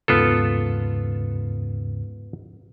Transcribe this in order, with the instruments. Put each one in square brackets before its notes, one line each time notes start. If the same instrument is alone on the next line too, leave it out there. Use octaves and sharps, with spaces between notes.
[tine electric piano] D#2 G#2 C#3 [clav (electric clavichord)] B3 F4 A4